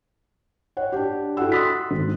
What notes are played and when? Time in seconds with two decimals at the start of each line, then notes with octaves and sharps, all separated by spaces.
0.77 C#5 F#5
0.92 D4 G4
1.37 E4 F#4 A4 F#5 E6
1.52 C6 D#6 E6 F#6 A6 B6
1.91 G#1